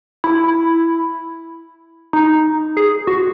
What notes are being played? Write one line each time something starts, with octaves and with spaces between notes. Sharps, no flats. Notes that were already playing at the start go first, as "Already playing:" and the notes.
E4
D#4
G#4
F#4